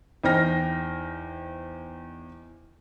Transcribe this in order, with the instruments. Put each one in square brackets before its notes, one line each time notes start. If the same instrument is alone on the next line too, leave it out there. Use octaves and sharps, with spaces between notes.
[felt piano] E2 D#4 C5 G5 F6 A#6